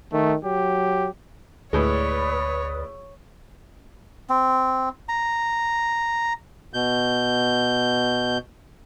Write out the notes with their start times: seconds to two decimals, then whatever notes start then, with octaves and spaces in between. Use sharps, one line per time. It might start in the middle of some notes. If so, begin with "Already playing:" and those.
0.12 D#3 A3
0.44 F#3 G4
1.73 D2 A2 G#3 B4 C#5 D5 D#6
4.29 C4
5.09 A#5
6.74 B2 G6